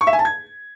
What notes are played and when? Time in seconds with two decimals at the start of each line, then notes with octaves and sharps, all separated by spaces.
0.01 C#6
0.07 E5
0.13 G#5
0.19 A5
0.25 G#6